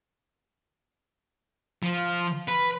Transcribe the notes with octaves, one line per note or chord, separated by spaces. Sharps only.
F3
B4